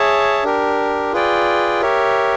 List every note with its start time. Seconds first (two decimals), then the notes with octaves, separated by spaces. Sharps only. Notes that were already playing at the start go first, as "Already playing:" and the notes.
Already playing: G#4 C#5 E5 A5
0.43 D4 G4 A#4
1.13 F4 G#4 B4 D5 G5
1.81 G4 A#4 C#5 E5